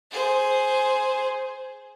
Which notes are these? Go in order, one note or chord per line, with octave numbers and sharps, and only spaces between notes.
G#4 C5